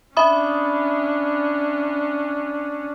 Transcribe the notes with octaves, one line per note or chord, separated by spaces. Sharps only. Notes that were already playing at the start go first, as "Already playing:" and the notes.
C#4 D4 E5 B5 D#6